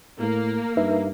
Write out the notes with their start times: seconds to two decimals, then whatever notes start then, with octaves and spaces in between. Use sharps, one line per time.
0.20 A2 A#3
0.77 G2 D#4 B4 E5